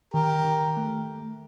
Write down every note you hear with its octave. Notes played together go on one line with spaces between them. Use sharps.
D#3 G4 A#4
D#3
A3